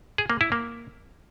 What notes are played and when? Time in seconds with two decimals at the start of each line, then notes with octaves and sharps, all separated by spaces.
0.18 G#4
0.30 A#3
0.41 E4
0.52 A#3